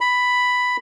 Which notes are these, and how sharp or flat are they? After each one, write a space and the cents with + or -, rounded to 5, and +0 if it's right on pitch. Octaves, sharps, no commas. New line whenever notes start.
B5 +5